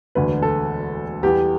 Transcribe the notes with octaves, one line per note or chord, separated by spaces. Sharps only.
E1 D2 D3 B4
A4
E2 E3 G3 B3 G4